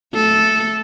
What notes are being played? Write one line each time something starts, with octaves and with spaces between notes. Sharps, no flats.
A3 A4